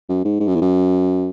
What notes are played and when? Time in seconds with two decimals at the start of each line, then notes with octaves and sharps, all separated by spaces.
0.09 F#2
0.25 G#2
0.40 G#2
0.47 F#2
0.55 E2
0.62 F#2